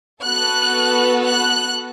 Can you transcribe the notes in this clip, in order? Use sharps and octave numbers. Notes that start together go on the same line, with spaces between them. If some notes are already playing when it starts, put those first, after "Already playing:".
B3 F#4 A4 F#6
F#6